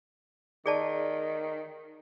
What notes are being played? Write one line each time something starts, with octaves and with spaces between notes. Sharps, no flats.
D#3 G#4 D5 A5